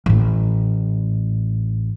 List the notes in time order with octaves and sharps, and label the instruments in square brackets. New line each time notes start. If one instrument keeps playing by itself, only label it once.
[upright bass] A1 A2